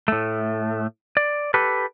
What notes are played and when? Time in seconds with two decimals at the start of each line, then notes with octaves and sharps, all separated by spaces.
0.08 A2 A3
1.17 D5
1.54 G4 A4 B4